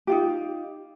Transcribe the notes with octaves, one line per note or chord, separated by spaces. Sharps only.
D#4 F4 G4